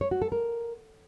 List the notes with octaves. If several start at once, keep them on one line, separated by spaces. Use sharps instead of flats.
C#5
F#4
A4
A#4